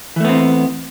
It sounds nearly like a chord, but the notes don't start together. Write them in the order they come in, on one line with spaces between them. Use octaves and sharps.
E3 A3 B3 C4